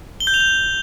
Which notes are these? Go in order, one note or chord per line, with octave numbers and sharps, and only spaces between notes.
G7
G6
F7
G6